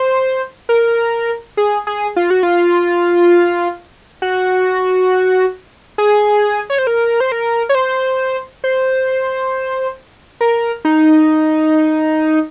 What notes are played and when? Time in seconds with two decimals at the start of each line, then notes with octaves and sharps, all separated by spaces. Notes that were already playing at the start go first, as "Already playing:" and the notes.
Already playing: C5
0.69 A#4
1.57 G#4
1.87 G#4
2.16 F4
2.30 F#4
2.43 F4
4.22 F#4
5.98 G#4
6.70 C#5
6.78 C5
6.87 A#4
7.20 C5
7.32 A#4
7.69 C#5
7.75 C5
8.64 C5
10.41 A#4
10.85 D#4